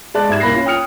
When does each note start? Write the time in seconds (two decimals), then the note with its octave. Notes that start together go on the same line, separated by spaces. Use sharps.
0.14 G#3 D5 A5 F#6
0.28 G#2 A3 G4 G#6 E7
0.40 C2 A#3 B5 F#6 A#6 C7
0.53 C#4 F4
0.66 G5 D#6 F6 C#7 F7